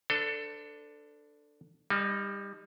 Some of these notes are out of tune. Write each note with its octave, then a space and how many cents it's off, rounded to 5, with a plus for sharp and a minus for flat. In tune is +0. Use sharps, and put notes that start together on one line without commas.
D4 +0 A4 +15 C5 -40
G3 +25 D#4 +0